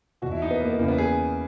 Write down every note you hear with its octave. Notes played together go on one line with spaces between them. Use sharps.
E2 B2 F#4
E4
D#4
B3
A#3
B3
E2 C#3 E3 A#3
B3
G#4